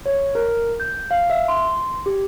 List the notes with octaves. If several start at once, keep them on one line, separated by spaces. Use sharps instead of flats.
C#5
A#4
G6
F5
E5
C6
G4